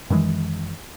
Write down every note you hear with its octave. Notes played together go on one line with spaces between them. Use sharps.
F#2 D#3 E3 G#3